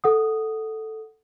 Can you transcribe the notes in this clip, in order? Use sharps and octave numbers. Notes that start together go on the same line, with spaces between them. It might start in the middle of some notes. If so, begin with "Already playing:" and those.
A4 F#5 D#6